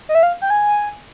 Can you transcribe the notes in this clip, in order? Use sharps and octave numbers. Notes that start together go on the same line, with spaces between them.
D#5
E5
F5
G5
G#5